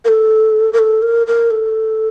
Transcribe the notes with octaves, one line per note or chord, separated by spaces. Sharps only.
A#4
A4
A#4
A4
A#4
A#4
A4